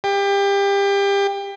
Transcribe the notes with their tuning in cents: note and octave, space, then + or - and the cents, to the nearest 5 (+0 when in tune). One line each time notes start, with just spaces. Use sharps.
G4 +25